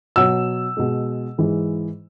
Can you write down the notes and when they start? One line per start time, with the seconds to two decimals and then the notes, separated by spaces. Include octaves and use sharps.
0.16 B2 F#3 E6
0.77 B2 G#3
1.38 G#2 E3 G#3